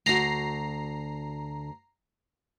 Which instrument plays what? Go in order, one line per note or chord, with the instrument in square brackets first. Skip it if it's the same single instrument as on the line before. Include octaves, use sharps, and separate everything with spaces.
[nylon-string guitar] D2 F#4 [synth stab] A#5 C7